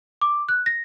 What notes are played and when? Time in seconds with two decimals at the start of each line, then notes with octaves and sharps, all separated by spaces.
0.21 D6
0.49 F#6
0.66 A#6